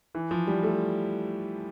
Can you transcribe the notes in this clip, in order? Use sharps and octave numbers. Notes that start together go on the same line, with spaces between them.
E3
F3
G3
A3